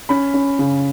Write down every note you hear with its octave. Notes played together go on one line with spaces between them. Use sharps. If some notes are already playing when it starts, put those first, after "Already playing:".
C#4 B5
C#4
C#3